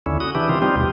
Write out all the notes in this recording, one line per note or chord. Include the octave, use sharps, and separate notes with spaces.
D#2 D3 C#4 E4
F#4 D#6
C#3 E3 D4 E4 G4
D#3 E3 C4 F4
G3 C4 D#4 F4 G4
D#2 B2